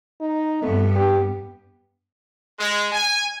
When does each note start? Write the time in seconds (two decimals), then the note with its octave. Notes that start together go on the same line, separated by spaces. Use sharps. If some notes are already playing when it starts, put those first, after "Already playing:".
0.21 D#4
0.63 G2 A3 B3
0.95 G4
2.59 G#3
2.92 G#5